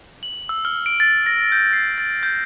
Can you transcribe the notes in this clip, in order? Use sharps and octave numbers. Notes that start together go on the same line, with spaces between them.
F#7
E6
F6
D7
A6
A#6
G6
C7
A6
G6